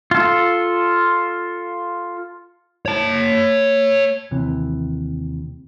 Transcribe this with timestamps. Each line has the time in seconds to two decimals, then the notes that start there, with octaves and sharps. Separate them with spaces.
0.11 F4 A4
2.86 C#5 A5
4.31 D#2 C3 E3